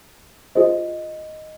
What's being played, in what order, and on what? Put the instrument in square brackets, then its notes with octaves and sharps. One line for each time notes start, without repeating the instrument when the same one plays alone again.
[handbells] F4 G#4 C5 [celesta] D#5